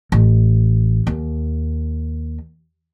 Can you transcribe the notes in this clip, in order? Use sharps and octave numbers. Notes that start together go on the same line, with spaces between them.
A1
D#2